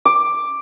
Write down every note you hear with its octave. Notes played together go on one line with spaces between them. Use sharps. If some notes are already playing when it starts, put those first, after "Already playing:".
D6